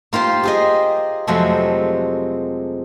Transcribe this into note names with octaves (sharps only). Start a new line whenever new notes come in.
A#3 F4 G4 C5
G4 G#4 D#5
F2 C3 F#3 G#3 A3